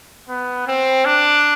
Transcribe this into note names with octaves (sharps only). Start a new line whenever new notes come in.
B3
C4
D4